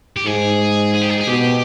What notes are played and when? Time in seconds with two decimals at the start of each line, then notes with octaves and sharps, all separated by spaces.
0.17 G4
0.26 G#2 G#4
0.94 G#4
1.01 G4
1.10 G#4
1.20 G#4
1.27 B2 G4